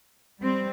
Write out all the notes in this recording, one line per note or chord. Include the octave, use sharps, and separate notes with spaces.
G3 C4